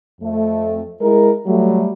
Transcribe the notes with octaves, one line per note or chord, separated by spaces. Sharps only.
F2 A3
G#3 E4 A#4
F#3 G3 A3